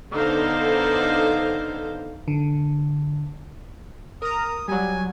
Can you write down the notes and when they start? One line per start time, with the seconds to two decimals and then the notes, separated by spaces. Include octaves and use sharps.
0.11 D3 B3 D#4 C5 F5
2.28 D3
4.22 A#4 A#5 D#6
4.68 F#3 G3 G#5